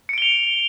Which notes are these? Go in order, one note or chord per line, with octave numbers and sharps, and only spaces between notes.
C#7 D7 F7 G7